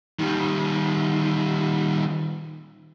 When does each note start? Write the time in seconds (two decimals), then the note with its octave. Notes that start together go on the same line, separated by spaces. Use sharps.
0.19 D#3 G3